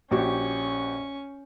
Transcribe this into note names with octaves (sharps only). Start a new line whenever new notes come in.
A#1 C#4 F#4 G4 C#6